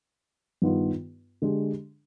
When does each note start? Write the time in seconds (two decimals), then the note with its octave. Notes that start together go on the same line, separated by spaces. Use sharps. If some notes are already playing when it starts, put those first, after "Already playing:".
0.62 G2 D#3 B3 F4
1.42 D3 G#3 D4 G4